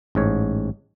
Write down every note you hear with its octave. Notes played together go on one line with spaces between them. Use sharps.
A1 G#2 C#5